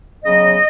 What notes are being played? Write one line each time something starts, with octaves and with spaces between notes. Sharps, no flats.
C#3 F#3 B3 D#5